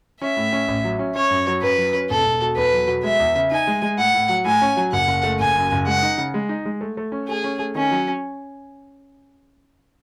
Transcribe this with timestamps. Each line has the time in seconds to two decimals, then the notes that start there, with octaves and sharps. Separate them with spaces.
0.21 C#4 E5
0.37 A2
0.52 C#4
0.68 A1
0.84 F#3
0.99 C#4
1.15 C#4 C#5
1.30 F#2
1.47 F#3
1.62 F#2 B4
1.78 F#3
1.94 C#4
2.10 E1 A4
2.26 E1
2.42 B2
2.57 E2 B4
2.73 F#3
2.88 B2
3.03 G#3 E5
3.20 E2
3.35 C#3
3.51 D#4 G#5
3.67 G#3
3.82 G#3
3.98 A2 F#5
4.14 A2
4.29 F#3
4.45 A2 G#5
4.61 C#4
4.77 F#3
4.92 F#1 F#5
5.08 F#1
5.23 A3
5.40 F#1 G#5
5.56 F#2
5.72 F#1
5.87 G#3 F#5
6.03 D#4
6.18 C#3
6.34 G#3
6.49 D#4
6.65 G#3
6.81 A3
6.97 A3
7.12 C#4
7.28 A3 G#4
7.44 C#4
7.59 A3
7.75 D#3 C#4
7.91 F#3